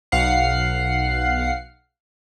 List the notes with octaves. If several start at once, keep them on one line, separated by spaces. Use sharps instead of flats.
B1 F5 F#5 C7